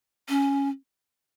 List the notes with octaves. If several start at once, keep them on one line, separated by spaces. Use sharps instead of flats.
C#4